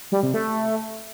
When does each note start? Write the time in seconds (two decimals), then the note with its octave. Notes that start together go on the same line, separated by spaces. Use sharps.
0.12 G3
0.23 C3
0.34 A3